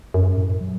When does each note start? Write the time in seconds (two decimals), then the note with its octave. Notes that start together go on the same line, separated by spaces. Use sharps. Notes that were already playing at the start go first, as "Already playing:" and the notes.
0.14 F#2
0.37 A2
0.61 F#3